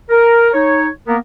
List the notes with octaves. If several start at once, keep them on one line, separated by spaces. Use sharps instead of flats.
A#4
D#4 C#5
A#3 B3 A#4